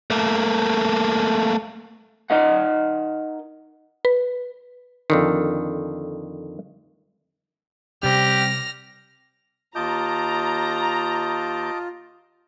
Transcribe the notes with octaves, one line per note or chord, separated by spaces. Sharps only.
A3 A#3
D#4 A#4 D#5 F#5
B4
F2 D3 D#3
C3 G3 C4 C#4 G4 F6 A#6
D#2 F4 D#5 A5 A#5 D6 G6